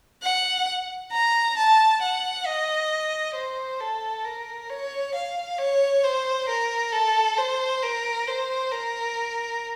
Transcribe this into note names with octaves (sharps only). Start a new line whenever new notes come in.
F#5
A#5
A5
F#5
D#5
C5
A4
A#4
C#5
F5
C#5
C5
A#4
A4
C5
A#4
C5
A#4